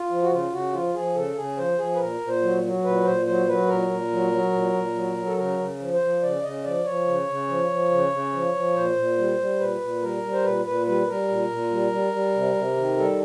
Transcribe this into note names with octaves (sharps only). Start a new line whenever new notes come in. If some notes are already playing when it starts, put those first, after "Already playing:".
Already playing: F4
F3
F#4
C#3 F4
C#3 F#4
F3 F4
F3 G#4
C#3 A4
C#3 G#4
F3 C5
F3 G#4
B4
A#2 A#4
A#2
C5
F#3
F#3
A#2 B4
A#2 C5
F#3 C5
F#3 B4
A#2 A#4
A#2
F#3
F#3
A#2
A#2
F#3
F#3
A4
C#3 A#4
C#3
F3
C5
F3
C#3 D5
C#3 D#5
F3 D5
F3 C#5
C#3
C#3
F3
F3
C#3
C#3
F3
F3
A#2 C5
A#2
G3
G3
A#2 B4
A#2
G3 A#4
G3
C5
A#2 B4
A#2 B4
G3 B4
G3 A#4
A#2
A#2
G3
G3
G3
C3
C3
D#3
G3 A4